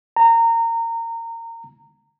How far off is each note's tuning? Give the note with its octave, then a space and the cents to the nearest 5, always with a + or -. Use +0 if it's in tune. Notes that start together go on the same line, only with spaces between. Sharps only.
A#5 -25